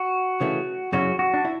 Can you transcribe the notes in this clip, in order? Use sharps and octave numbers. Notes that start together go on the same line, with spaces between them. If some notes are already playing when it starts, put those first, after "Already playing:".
Already playing: F#4
C#3 E3 A3
F#2 C#3 F#3 C#4 E4 F#4
F#4
D4
E4